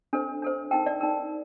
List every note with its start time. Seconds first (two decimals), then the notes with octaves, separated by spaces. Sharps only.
0.13 D4 A4 C5
0.42 D4 A4 C5
0.71 D#4 A#4 G5
0.86 D5
1.01 D#4 A#4